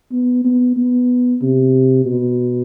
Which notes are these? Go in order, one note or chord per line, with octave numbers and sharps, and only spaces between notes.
B3
B3
B3
C3
B2